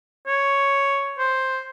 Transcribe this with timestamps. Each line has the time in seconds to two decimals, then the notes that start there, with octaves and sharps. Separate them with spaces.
0.27 C#5
1.19 C5